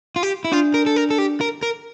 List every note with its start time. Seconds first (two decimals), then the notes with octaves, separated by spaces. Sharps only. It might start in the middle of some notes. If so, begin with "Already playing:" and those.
0.16 F4
0.23 G4
0.45 E4
0.52 D4 F4
0.74 A#4
0.86 A4
0.96 A#4
1.10 A4
1.18 G4
1.41 A#4
1.63 A#4